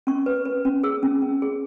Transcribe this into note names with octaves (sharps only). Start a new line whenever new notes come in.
C#4 C#6
B4
B4
C#4
G#4 E6
C#4
C#4
G#4